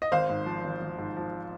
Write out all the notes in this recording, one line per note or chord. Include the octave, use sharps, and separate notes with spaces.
D#5
G#1 C5 F5
G#2
F3
G#1
G#1
G#2
F3